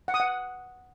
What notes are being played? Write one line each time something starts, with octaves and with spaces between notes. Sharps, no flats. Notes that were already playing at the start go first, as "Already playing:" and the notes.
F#5
D#6
F#5